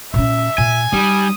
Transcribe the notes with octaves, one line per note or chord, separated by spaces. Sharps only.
A#2 C#4 E5
A#2 G#5
G3 D#4 D#6